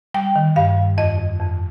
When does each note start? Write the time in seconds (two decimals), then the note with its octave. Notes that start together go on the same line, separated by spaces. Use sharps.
0.14 G3 G5
0.36 D#3
0.56 G2 F5
0.77 G3
0.98 F2 D#5
1.18 F2
1.40 F2